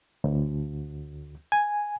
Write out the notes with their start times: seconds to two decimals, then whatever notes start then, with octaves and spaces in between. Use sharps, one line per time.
0.24 D2
1.52 G#5